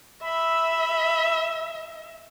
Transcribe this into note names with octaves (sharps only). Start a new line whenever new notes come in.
E5 B5